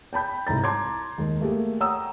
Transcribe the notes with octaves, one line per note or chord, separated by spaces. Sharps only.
G5 A5 B5 G6
C2 G#2 A#5 A6
A5 A#5 C6 D6 G#6
D#2 G#3
A3 A#3 G4 G#4
C#5 F#5 G5 A#5 D#6 E6